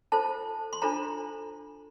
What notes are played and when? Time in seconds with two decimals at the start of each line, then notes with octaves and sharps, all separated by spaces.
0.12 F4 A4 C5 A5
0.73 C6
0.82 D4 F4 A4 C5 A#5